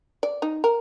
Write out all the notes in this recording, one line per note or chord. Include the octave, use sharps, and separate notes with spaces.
D5
D#4
A#4